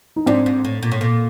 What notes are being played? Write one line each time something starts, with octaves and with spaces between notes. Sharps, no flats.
D#4
G#2 C4 D4
G#2
A2
A#2
A2
A#2